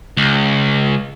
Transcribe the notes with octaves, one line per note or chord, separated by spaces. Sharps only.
C#2